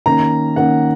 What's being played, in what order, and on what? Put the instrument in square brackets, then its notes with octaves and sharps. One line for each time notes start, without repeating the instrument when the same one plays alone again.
[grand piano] D#3 A#3 C#4 A#5
D#3 A#3 C#4 F#5